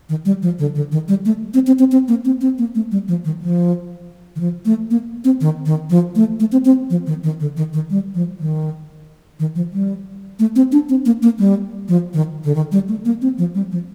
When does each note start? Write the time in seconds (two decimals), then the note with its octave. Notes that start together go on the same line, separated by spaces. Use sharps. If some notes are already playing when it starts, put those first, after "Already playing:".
0.09 D#3
0.25 G3
0.42 F3
0.59 D3
0.75 D3
0.92 D#3
1.08 G3
1.25 A3
1.54 C4
1.67 C4
1.79 C4
1.92 C4
2.08 A#3
2.25 C4
2.41 C4
2.58 A#3
2.75 A3
2.91 G3
3.08 F3
3.25 D#3
3.42 F3
4.36 D#3
4.40 F3
4.65 A3
4.91 A#3
5.25 C4
5.41 D#3
5.66 D#3
5.90 F3
6.16 A3
6.40 A3
6.52 C4
6.65 C4
6.90 F3
7.07 D#3
7.23 D#3
7.40 D3
7.57 D#3
7.73 D#3
7.90 G3
8.15 F3
8.40 D#3
9.39 D#3
9.55 F3
9.73 G3
10.39 A3
10.56 C4
10.72 D4
10.89 C4
11.06 A#3
11.22 A#3
11.39 G3
11.88 F3
12.14 D#3
12.44 D3
12.55 D#3
12.72 G3
12.88 A3
13.05 A#3
13.22 C4
13.38 F3
13.55 G3
13.72 F3